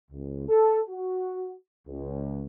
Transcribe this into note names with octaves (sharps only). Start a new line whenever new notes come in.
C#2
A4
F#4
C#2